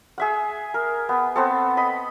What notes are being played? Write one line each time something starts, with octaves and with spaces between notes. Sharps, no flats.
G#4 E5 F#5
A#4
B3
B3 C4 A4
D#5 B5